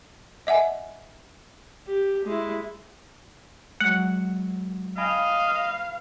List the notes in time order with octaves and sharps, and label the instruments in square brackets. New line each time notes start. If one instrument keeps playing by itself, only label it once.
[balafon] D#5 E5 F#5 G#5
[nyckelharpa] G4
G#3 E4
[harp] F#3 G#3 [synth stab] F#5
[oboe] D#5 [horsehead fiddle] F5 [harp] G5 G#5 B5
[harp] B4